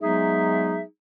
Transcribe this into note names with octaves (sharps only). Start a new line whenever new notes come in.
F#3 G#3 B3 D#4 G#4 E5